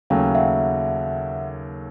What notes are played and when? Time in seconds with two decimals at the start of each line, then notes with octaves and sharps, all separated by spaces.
0.10 D#2 C#3 F#3 A3 F5 G5
0.35 E5 F#5